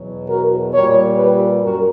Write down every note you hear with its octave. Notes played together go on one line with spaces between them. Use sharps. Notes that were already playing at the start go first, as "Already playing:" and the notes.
Already playing: E2 B2 F#3
F#4 A#4
A#2 G3 A#4 C#5
G4 B4
F#2 F#4 A#4